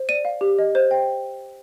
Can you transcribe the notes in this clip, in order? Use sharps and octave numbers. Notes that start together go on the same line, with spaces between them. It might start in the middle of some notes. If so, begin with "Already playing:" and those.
Already playing: C5
D5 D#7
F5
G4
D#5
C5
G5